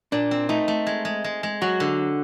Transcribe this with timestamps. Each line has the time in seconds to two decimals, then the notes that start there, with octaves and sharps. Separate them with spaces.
0.12 A#2 D4
0.31 C4
0.49 A3 D#4
0.68 A3
0.87 G#3
1.05 G#3
1.24 G#3
1.43 G#3
1.62 F#3 F#4
1.80 D3